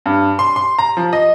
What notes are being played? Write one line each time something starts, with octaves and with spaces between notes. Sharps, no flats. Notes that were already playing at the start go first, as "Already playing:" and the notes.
G2
C6
C6
A#5
F3
D#5